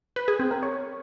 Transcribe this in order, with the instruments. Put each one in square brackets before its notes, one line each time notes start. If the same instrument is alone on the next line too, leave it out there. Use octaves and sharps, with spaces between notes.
[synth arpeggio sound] B4
G#4
C4
A#4
C#5